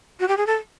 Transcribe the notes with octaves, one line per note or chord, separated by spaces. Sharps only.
F#4
G4
G#4
A4